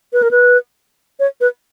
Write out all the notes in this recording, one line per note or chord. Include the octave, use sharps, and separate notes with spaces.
B4
A#4
B4
C#5
B4